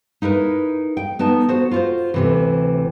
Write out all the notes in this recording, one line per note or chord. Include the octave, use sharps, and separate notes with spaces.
D#4 E4 A#4 B4
G5
B3 D#4 A5
F#4 C5
F4 F#4 C5
D2 C3 E3